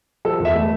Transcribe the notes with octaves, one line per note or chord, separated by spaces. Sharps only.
F3 A4
E2
E5
A3